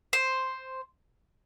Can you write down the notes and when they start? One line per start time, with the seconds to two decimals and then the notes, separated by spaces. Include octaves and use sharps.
0.13 C5